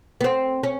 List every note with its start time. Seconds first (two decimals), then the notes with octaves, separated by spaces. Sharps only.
0.21 B3
0.24 C4
0.63 C#4